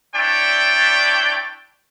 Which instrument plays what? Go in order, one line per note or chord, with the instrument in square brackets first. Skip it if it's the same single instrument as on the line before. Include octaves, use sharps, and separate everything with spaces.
[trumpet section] D4 E4 C#5 D5 G5